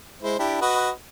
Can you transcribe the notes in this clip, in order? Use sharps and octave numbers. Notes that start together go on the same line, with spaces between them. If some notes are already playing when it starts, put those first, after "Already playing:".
G#3 E4 C5
D4 E4 G4
F#4 B4 D#5